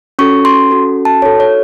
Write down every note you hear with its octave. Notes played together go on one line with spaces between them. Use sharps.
C#4 F#4 A4 C#6
C6
C#4 F#4 A4
A5
D#4 F#4 A4 C#5
C#5